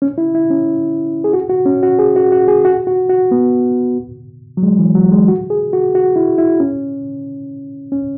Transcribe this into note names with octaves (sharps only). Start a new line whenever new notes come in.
C#4
E4
E4
C#4
G#4
F#4
F#4
C#4
F#4
G#4
F#4
F#4
G#4
F#4
F#4
F#4
B3
F#3
G#3
E3
F#3
G#3
F#4
G#4
F#4
F#4
E4
E4
C#4
C#4